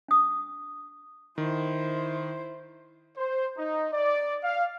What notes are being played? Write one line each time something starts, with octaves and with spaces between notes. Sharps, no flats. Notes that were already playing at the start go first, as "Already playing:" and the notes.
D4 D#6
D#3 E4 C5
C5
D#4
D5
F5